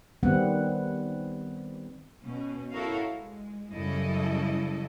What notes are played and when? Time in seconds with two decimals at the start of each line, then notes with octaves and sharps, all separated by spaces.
0.23 D#3 G3 B3 C4 F#5
2.24 B2 C#4
2.73 E4 F#4 A4 A#4 C#5 F5
3.09 G#3
3.73 F#2 C#3 G3 E4 A4 D#5